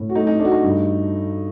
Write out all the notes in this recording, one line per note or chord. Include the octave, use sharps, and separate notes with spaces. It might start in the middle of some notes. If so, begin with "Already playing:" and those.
Already playing: A2
F#4
A3 D#4
D#4
A3 D4
F#4
D#4
G2